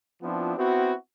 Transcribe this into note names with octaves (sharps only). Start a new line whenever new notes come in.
F3 B3 C4 D4 E4 F4
B3 C4 E4 F#4